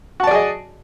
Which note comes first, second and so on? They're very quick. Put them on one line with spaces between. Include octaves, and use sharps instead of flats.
F#4 A5 D5 G#4 D#5